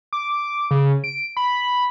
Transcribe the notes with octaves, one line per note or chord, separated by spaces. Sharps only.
D6
C#3
D7
B5